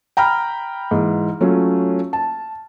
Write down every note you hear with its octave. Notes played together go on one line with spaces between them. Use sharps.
G5 A#5 B5 F6
G#2 E3
F#3 A3 C#4 F4
A5